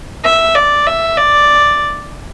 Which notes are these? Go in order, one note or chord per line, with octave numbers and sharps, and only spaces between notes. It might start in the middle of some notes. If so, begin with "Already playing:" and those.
E5
D5
E5
D5